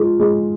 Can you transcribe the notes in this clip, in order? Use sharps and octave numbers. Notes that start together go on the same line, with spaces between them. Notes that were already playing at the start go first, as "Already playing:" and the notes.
Already playing: G#3 F4
G#3